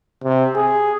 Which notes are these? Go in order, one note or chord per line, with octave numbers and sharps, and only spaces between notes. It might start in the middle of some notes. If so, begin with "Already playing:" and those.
C3
G#4